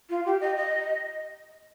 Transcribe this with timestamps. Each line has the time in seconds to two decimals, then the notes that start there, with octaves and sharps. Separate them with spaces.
0.09 F4
0.25 G4
0.41 D#5
0.57 D#5